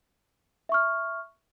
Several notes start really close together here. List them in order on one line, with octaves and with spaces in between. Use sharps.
E5 C#6 F6